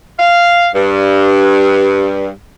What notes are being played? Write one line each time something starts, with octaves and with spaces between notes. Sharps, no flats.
F5
G2